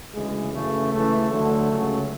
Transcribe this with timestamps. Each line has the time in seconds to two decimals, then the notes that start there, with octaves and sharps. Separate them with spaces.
0.15 D2 C#3 E3 G#3
0.53 F#2 C#3 E3 A3
0.91 C#2 C#3 E3 A3
1.31 D2 D3 F#3 A3
1.69 C#2 C#3 F#3